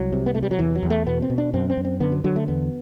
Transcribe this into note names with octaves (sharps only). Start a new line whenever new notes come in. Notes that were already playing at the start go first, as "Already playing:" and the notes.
Already playing: C2 F#3
C3
B3
C3 A3
G3
F#3
E2 E3
F#3
E2
A3
B2 B3
C4
B2
D4
F#2 C4
C4
F#2
C4
D3 B3
F#3
D3 F#3
A3
E2 B3